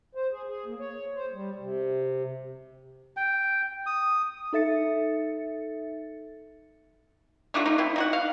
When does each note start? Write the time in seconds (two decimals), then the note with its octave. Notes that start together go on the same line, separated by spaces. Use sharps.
0.15 C5
0.31 G#4
0.48 G#4
0.66 A#3
0.80 C#5
1.15 C5
1.33 G3
1.59 C3
3.17 G5
3.86 D#6
4.53 D#4 A4 E5 A6 C#7
7.54 A3 D4 F4 F#4
7.66 D#4 F4
7.78 C4 E4 F4
7.96 D#4 F#4 F#5
8.13 F5